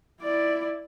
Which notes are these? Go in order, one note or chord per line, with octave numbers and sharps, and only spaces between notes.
E4 D5